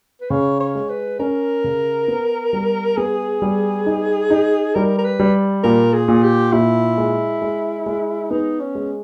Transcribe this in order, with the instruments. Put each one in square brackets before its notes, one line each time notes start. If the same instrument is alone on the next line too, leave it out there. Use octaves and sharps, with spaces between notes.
[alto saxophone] B4
[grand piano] C#3 [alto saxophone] C#5
[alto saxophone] C#5
[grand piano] G#3
[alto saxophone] B4
[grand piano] C#4 [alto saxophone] A#4
[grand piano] C#3
B3
G3
[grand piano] B3 [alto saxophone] G#4
[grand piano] G3
D#4
D#4
[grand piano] G3 [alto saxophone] A#4
[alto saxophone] A#4
B4
[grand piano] G3
[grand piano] A#2 [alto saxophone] A#4
[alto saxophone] G#4
[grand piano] A#2
[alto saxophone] G4
[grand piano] A#2 [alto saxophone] E4
[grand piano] G#3
G#3
G#3
[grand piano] B3 [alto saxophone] D#4
[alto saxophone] C#4
[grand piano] G#3